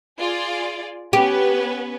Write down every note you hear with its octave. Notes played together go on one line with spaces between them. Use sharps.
F4 G#4 D5
B3 C#4 G4 B4